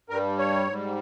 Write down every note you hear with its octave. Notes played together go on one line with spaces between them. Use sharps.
G2 G3 A#4
C#5
G#2 G3